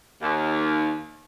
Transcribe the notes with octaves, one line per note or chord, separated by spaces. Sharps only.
D#2